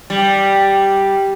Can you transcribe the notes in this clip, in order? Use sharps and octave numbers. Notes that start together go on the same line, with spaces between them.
G3